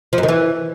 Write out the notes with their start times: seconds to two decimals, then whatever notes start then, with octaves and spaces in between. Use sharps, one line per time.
0.13 F3
0.18 F#2
0.23 D#3
0.28 E3